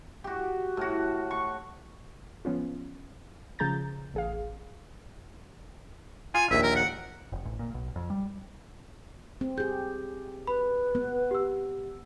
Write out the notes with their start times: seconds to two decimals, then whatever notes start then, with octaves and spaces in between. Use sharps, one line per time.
0.24 F#4 G4
0.77 A2 F#4
1.31 C#6
2.45 F3 B3 C#4 F4
3.59 C#3 F3 G#4 A#5 G6 A6
4.14 A1 G#4 F5
6.35 F4 G#5
6.51 A#1 D#2 E5
6.63 A#4
6.76 F#5
7.32 F1
7.45 A1
7.59 A#2
7.74 B1
7.96 F2
8.10 G3
9.41 C4
9.58 G4 G#4 G6
10.47 B4 B5
10.95 B3
11.31 G4 E6